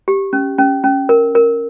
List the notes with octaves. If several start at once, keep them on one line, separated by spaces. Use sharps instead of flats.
G4
C#4
C#4
C#4
A#4
A#4